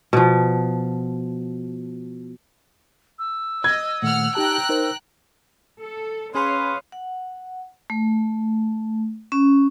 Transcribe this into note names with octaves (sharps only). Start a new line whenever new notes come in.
B2 F3
E6
D#5 G#6
A#2 D#3 A3 F#5 F6
D#4 G4 G5 A5 A#5 F#6
D#4 A#4 C5
A4
C#4 G#4 B4 C#5 F5 B5 C6 D#6
F#5
A3
C#4